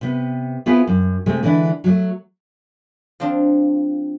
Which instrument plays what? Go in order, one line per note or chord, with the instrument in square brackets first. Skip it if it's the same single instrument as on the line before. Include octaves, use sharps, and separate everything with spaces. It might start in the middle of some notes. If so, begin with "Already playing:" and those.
[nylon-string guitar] C3 B3
B3 C4 E4 F4 G#4 B4
F#2
C3 G#3 A3 C4
D3 E3 G#3 D4 E4
F#3 G3 A3
[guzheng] F3 C4 D4 F4